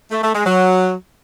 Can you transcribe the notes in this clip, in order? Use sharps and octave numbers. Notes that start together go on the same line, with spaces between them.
A3
A3
G#3
F#3